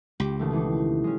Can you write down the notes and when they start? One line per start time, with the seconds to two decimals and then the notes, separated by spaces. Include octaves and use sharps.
0.20 C#2 G4
0.39 B2 D#3 A3
0.52 E3 D4 D#4
1.04 G#3 C#4